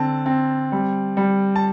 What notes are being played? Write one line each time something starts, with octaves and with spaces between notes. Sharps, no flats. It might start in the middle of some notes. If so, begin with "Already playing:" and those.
Already playing: D3 C4 A5
C4
G3
G3
A5